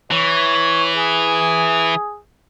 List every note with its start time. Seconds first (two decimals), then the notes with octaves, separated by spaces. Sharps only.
0.11 E3 C#5
0.95 G#4